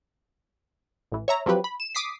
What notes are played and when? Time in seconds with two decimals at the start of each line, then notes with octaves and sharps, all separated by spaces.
1.12 A1 E3
1.28 C#5 E5 A#5
1.46 F3 F#3 C4 G4 B4
1.64 B5
1.80 E7
1.95 D6 D#6 B6 C7